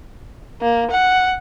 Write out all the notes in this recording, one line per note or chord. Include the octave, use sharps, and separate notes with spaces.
A#3
F#5